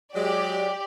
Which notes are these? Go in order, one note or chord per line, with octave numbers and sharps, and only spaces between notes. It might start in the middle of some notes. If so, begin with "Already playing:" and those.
F#3 G#3 G4 D5